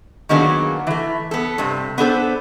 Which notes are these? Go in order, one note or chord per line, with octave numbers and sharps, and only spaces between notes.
D#3 F#3 A#3 B3 D4 G#4
E3 A3
B3 A4
G2 C3
B3 D4 A4 C5